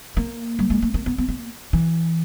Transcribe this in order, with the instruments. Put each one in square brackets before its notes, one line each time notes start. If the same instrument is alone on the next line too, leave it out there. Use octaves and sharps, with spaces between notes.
[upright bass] A#3
G3
G#3
A3
A#3
B3
B3
A#3
E3